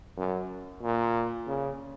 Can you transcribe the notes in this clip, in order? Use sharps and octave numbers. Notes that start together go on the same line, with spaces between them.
F#2
A#2
C#3